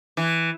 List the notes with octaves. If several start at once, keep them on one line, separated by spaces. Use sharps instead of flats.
E3